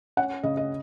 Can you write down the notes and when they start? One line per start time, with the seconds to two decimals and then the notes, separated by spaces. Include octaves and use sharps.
0.17 C#4 F#5
0.43 C#3 D#5
0.57 D#5